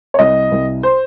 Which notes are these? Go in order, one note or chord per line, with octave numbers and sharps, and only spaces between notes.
C#5
C2 D#5
C2
C5